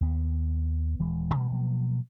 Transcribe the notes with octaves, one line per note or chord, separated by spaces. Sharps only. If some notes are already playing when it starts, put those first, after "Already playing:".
D#2 B3
D#1 E3 G#3
A#2 E3 G3 A3
B2 F3 F#3 A#3